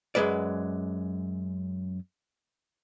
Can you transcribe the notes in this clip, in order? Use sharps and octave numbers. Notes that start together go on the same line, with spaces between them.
F#2 C3 G#3 B4 D5